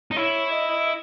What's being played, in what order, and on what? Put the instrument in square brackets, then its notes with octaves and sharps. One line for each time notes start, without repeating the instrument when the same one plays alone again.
[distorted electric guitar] D#4
[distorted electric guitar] E4 [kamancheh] C#5
[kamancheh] D#5